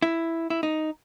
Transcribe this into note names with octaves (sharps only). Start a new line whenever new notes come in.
E4
E4
D#4